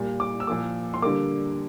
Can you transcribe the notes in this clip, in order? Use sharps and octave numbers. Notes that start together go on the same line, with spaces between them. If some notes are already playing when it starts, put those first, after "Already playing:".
Already playing: A#2 G3 A#3
D6
E6
A#2 F3 A#3 D6
C6
D3 G3 A#3 D6